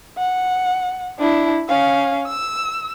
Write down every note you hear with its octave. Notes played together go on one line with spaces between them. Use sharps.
F#5
D4 E4
C#4 F5
E6